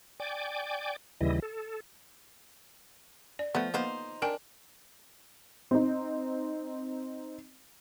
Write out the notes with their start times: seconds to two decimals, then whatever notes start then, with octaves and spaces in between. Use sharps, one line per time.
0.20 D5 G5 G#5 D6
1.21 D#2 C#3 E3 G3 E4 D#5
1.42 A4
3.39 D5
3.55 F3 A3 B3
3.74 A#3 B3 D#4 C5
4.22 D4 A#4 G5 G#5
5.71 C4 D#4